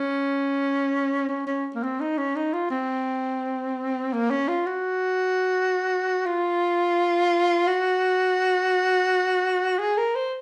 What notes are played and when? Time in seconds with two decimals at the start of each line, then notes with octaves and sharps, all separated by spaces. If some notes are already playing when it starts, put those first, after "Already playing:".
Already playing: C#4
1.29 C#4
1.47 C#4
1.75 A#3
1.83 C4
2.01 D#4
2.18 C#4
2.36 D#4
2.53 F4
2.71 C4
4.13 A#3
4.31 C#4
4.48 F4
4.66 F#4
6.26 F4
7.67 F#4
9.79 G#4
9.98 A#4
10.15 C5